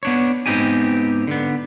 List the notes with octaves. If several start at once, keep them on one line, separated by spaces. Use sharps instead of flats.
B3 D4 C#5
G#2 B3 C4 D#4 G4 G#5
D3 B3